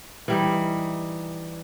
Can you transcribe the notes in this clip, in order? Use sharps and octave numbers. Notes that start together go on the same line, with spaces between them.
E3 G3 D#4